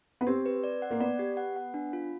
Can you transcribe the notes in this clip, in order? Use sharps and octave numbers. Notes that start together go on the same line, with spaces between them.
B3
C4 G4
B4
D5
F#5
A#3
B3 D5
G4
F#5
F#5
D4
F4